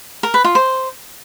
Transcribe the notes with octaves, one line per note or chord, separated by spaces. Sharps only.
A#4
B4
F4
C5